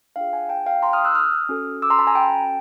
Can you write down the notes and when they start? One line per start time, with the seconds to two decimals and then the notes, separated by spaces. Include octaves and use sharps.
0.16 D4 F4 G#4 F5 G5
0.33 F#5 G#5
0.49 G5 A5
0.66 F5 G5
0.82 A#5 C6
0.93 D#6 F6
1.05 E6 F#6
1.15 D#6 F6
1.49 C#4 F#4 A4
1.82 D6 E6
1.90 A#5 C6
1.99 A5 B5
2.07 G#5 A#5
2.15 G5 A5